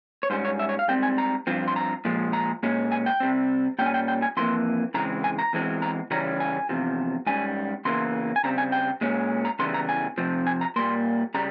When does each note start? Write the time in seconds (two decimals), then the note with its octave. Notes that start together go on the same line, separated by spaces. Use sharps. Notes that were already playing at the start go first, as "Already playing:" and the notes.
0.23 C#5
0.30 G#2 G3 C#4 C5
0.45 C#5
0.59 E5
0.69 C#5
0.79 F5
0.88 G#2 G3 C4 G5
1.03 G#5
1.18 A#5
1.47 G2 F3 C4
1.68 C6
1.76 A#5
2.05 A#2 F3 G#3
2.33 A#5
2.63 A#2 G#3 C#4
2.92 G#5
3.06 G5
3.20 C3 G3 C4
3.79 A#2 G3 C#4 G5
3.86 G#5
3.94 G5
4.08 G5
4.22 G#5
4.37 F2 E3 A#3 C6
4.94 C#3 E3 G#3 C4 A#5
5.24 G#5
5.39 A#5
5.53 E2 E3 G#3 C4
5.82 A#5
6.11 C#3 E3 G3 C#4 A#5
6.40 G#5
6.69 E2 C3 F3
7.26 G#2 G3 C#4 G#5
7.85 E2 C#3 E3 A#3 C6
8.36 G#5
8.44 C#3 G3 C4 A#5
8.58 G#5
8.72 G5
9.01 A#2 G#3 C#4
9.45 A#5
9.59 E2 C#3 E3 G3 C6
9.74 A#5
9.89 G#5
10.18 C3 F3 C4
10.47 G#5
10.61 A#5
10.76 A#2 G3 A#3 C6
11.34 C#3 G3 A#5